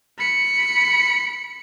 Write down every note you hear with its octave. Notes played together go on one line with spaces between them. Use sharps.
B5 C#7